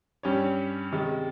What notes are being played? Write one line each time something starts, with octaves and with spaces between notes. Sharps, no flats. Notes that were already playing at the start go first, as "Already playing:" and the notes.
G2 G3 C#4 G4 C#5
C3 D#3 G#3